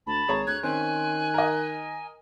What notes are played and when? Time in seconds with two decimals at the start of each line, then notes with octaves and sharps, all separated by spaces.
0.07 D2 A5 B5
0.28 G#1 G#4 C#5 A#5
0.47 D2 F#6 G#6
0.63 D#3 C4 C#4 G#5 F#6
1.34 A#4 D#5